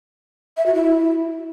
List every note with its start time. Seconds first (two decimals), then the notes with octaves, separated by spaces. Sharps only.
0.57 E5
0.66 F#4
0.75 E4